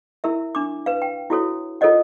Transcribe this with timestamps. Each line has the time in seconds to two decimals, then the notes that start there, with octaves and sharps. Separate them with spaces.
0.24 E4 A#4 E5
0.55 D4 D6
0.86 B4 F5
1.02 G5
1.30 E4 F#4 A4 C#5
1.81 F4 A4 A#4 C#5 D#5 F#5